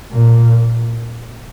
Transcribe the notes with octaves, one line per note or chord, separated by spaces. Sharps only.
A#2